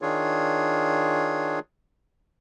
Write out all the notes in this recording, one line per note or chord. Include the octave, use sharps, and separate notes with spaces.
D#3 D4 F4 G#4 C#5